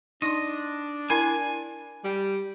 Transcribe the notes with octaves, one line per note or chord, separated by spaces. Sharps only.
D4 D#4 D#5 C6
E4 A#4 G#5 B5
G3